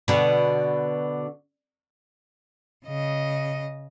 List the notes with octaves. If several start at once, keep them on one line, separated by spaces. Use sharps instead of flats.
B2 D3
C#3 D#5